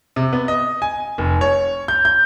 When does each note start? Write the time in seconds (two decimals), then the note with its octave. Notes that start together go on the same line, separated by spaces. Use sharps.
0.16 C3
0.33 B3
0.48 D#5
0.82 G#5
1.18 F1
1.41 C#5
1.88 G6
2.05 G6